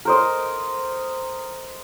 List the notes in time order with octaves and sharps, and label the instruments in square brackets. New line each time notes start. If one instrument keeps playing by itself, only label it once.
[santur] A#4 C5 D#5